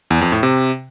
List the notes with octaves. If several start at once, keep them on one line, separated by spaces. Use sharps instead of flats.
E2
F2
A2
C3